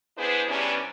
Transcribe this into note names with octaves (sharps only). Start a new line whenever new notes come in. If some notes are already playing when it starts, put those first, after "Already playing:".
B3 D4 E4 G#4 B4 C5
C3 E3 G3 B3 C#4 D4